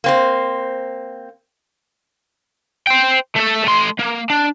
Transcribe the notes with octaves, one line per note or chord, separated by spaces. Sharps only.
A#3 C4 C5
C5 G5
A3 A4
A3 C6
A#3
D4